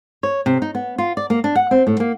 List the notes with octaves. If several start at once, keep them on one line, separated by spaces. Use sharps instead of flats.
C#5
C3
D#4
B3
F4
D5
A#3
D4
F#5
C4
A2
A#3